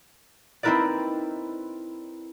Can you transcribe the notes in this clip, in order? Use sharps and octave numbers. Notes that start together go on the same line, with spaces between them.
C4 D#4 E4 A#4 B4 D5